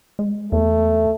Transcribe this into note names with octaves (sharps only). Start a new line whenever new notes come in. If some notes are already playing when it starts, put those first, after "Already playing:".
G#3
E2 A3